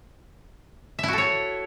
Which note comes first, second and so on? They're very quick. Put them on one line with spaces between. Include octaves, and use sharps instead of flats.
E5 E4 F#4 A4 C#5